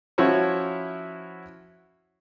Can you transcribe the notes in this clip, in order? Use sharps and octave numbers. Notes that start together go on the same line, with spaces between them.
F3 C#4 E4 F#4 C5 C#5